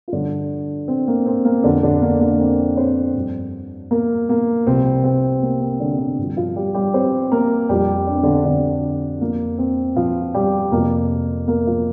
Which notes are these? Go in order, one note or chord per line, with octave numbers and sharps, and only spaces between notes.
F4
G2 D3 F3 D4
C4
A#3
C4
A#3
F2 D3 F3 D4
D3 D4
A#3
A#3
C4
C4 C5
G2 F3
A#3 A#4
A#3
C2 C3 F3 C4
C4
A#3
C4
D3 D4
D3 D4
G2 F3
F3 F4
G3 G4
G3 G4
C4 C5
A#3 A#4
F2 F3 G3 G4
D4
C4
D3 D4
D3 D4
F2 F3 A#3
C4
F3 F4
G3 G4
F2 C3 F3 A#3 A#4
A#3 A#4
F3 F4